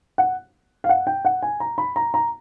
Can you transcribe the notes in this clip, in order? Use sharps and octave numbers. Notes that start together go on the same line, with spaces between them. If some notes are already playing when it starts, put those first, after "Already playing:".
F#5
F5
F#5
G5
F#5
G#5
A#5
B5
A#5
A#5